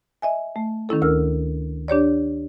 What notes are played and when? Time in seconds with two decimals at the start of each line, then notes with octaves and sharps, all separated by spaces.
0.22 D#5 E5 G#5
0.56 A3
0.89 D#3 C#4 E4 A4
1.02 D2 A#4 E6 F6
1.88 D4 G4 C#5 D5